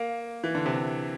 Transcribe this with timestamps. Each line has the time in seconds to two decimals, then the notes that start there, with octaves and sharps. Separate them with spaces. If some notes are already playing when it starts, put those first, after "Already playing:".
Already playing: A#3
0.44 E3
0.55 D3
0.66 C3